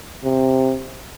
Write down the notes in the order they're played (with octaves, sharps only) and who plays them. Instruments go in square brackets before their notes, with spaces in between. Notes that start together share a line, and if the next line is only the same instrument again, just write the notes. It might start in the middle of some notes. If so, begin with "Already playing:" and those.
[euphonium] C3